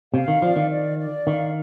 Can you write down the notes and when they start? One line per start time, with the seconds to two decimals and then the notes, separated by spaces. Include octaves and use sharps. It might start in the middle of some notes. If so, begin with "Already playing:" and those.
0.13 C3 F5
0.28 D#3
0.42 F3 D5
0.56 D#3
0.70 D5
0.99 D5
1.27 D#3 F5